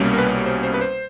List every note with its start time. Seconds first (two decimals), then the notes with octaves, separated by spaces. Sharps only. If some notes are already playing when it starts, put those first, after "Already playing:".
Already playing: C2 B2 G3 A#3 C#4
0.14 A#4
0.18 B4
0.46 C5
0.63 C5
0.74 B4
0.81 C5